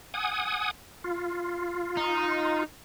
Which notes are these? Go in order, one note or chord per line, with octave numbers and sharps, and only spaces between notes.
F#5 G#5 D#6
F4
D#4